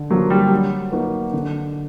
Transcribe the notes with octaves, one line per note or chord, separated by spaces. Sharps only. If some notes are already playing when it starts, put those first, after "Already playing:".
Already playing: D3
F3 F#3 A#3
G3
F#3
A#3 D#4 F#4 B4
D3